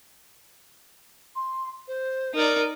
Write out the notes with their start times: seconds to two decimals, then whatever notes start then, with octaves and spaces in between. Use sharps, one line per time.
1.35 C6
1.87 C5
2.35 D#4 A#4 D5